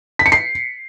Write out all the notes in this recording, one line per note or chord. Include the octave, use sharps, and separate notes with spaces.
B6
C#7
C7